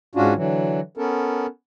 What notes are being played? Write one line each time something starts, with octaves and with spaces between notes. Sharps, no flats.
G#2 C#4 D4 F4 F#4
D3 E3 F#3
B3 C#4 A4 A#4